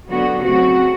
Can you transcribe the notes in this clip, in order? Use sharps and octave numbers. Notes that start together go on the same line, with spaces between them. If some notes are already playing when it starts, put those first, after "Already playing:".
D3 F#3 B3 F#4
C#3 F#3 A3 C4 F#4